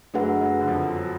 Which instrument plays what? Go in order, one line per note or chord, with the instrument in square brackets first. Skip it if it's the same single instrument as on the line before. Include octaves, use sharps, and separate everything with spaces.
[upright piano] F#2 F#3 [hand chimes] A3 D4 G#4 B4 F#5
[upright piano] F#2 F#3
D3
F2 F3
F#3